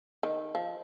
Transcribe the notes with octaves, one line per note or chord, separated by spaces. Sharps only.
D#3
F3